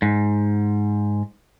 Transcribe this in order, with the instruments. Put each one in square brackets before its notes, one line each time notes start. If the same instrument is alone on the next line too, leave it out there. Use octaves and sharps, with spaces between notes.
[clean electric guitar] G#2